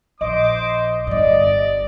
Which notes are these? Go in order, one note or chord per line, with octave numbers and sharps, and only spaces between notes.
A#1 C5 D#5 D6
G1 G2 D5